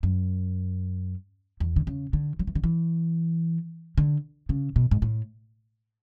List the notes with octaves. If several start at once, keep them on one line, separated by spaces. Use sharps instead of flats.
F#2
E2
D3
C#3
D3
F#3
E3
D3
E3
D3
C#3
B2
G#2
A2